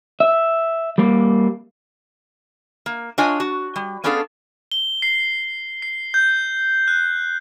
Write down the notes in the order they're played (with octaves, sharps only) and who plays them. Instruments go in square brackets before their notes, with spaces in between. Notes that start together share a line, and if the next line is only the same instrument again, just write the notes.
[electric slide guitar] E5
G3 A#3
[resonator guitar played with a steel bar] A#3
D4 F4 C#5 D#5 G#5
F#4
G3
B3 C#4 D4 G#4 A4 F5
[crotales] G7
C7
C7
G6
F#6